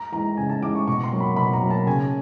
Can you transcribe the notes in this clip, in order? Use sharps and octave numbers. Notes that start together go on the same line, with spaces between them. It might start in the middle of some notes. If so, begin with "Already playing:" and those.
Already playing: A#5
E3 G#3 A#5
C#3 G#5
A5
E3 G#3 D6
C#6
B2 C#6
C6
F#3 A#3
B5
B2 B5
A#5
F#3 A#3
A5
C#3 G#5